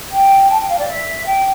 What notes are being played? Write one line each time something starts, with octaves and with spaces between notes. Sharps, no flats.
G5
A5
G5
F5
D5
E5
G5